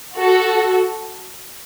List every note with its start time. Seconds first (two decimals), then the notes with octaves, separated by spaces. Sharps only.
0.17 F#4 A4